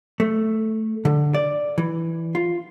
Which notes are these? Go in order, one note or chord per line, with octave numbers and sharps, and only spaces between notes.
A3
D3
D5
E3
F4